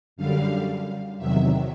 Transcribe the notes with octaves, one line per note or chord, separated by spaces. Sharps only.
F#2 D3 G3 F5
E2 C3 D#3 F#3 E5